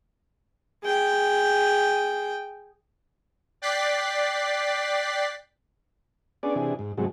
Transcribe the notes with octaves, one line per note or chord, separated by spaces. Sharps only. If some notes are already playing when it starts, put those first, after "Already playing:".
G#4 G5
D5 G5 F#6 A6 B6 C7
B3 C#4 D4 G#4 D5
C3 E3 D4 G#4
G#2
G#2 C3 F#3 G#3 A3